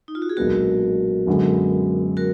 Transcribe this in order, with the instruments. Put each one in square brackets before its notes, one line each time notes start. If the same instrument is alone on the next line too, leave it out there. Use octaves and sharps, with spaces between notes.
[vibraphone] D#4
F4
F#4
G#4
[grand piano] B1 A#2 G#3 B3 D4 [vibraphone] F#4 A#4
[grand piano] F#2 D3 G#3 B3
[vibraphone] F#4 A#4